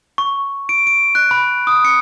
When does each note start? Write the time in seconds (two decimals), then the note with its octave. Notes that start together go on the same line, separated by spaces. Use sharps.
0.18 C#6
0.69 D7
0.87 D7
1.15 F#6
1.31 B5
1.67 D#6
1.85 C#7